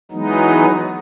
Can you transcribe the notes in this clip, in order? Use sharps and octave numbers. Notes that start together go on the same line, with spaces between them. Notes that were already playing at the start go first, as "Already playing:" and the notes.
E3 F#3 G#3 B3 D#4